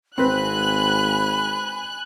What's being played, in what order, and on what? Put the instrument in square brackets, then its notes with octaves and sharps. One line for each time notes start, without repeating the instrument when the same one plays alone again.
[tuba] G#1 [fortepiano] C4 B4 [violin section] G#5 F#6 [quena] B5